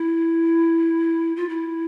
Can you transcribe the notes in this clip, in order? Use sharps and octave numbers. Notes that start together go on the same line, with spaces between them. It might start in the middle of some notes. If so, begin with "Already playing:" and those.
Already playing: E4
F4
E4